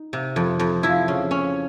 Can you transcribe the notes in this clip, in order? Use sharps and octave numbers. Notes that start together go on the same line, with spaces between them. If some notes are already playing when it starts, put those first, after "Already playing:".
Already playing: D#4
C3
F2
F2
F3 E4
C#3
C#4